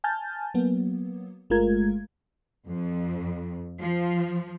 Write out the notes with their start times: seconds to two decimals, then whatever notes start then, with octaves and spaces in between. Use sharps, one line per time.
0.04 G#5 A5 F6 G6 A6
0.54 F#3 A#3 B3
1.50 G1 G#3 A3 F4 A#4 G#6
2.68 F2
3.81 F3